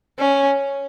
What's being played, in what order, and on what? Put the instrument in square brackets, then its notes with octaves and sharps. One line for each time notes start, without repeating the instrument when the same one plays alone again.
[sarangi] C#4